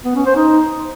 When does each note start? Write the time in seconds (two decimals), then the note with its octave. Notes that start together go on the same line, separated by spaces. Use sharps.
0.05 B3
0.15 C#4
0.26 C5
0.36 D#4